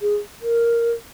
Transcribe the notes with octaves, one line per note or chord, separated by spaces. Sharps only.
G#4
A#4